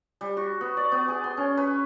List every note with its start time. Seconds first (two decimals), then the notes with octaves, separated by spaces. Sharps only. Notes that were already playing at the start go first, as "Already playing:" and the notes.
0.21 G3
0.37 F#4
0.61 B3
0.77 D5
0.92 B3
1.08 G#4
1.24 C6
1.37 C#4
1.57 B4